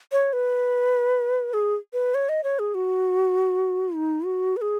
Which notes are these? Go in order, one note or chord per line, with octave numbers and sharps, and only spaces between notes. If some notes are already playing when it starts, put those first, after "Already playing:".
C#5
B4
G#4
B4
C#5
D#5
C#5
G#4
F#4
D#4
F#4
B4
G#4